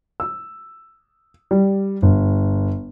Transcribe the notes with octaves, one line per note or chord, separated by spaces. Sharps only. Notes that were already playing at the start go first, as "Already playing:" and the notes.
E6
G3
G1